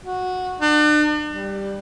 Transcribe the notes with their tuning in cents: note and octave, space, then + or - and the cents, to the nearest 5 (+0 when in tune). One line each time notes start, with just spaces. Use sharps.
F#4 -10
D4 +40
G3 +5